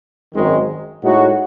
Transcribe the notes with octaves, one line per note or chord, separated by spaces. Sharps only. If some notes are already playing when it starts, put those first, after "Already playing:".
G#1 F#2 D#3 G#3
A2 G#3 D#4 F#4